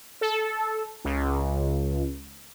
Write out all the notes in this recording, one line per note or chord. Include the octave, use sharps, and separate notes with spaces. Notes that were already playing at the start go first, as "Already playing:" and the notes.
A4
C#2